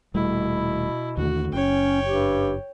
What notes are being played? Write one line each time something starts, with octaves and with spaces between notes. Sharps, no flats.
D#1 B2 G3 A3 E4
D#2 D3 A3 F#4
F#1 C#4 C#5 G5
G2 G4